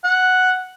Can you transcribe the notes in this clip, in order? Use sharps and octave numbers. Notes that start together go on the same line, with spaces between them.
F#5